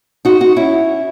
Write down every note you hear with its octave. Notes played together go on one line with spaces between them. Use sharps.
D#4 F#4
D#4 F#4
C#4 E4